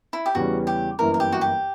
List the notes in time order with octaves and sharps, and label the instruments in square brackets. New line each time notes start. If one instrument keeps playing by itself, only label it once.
[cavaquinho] E4
G4
[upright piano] E2 C#3 E3 G3 C#4 [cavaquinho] F#4
[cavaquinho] G4
[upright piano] G1 F#2 E3 A#3 E4 [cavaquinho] A#4
[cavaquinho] A#4
G4
F#4
G4